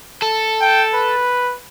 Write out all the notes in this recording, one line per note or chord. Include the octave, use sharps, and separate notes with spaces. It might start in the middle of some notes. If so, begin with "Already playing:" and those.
A4
G5
B4